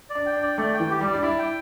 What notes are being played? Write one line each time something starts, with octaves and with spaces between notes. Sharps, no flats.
D5
D4
G5
D4
D5
A3 D5
G5
E3
G4
G3
D5
D4
E4 D5
G5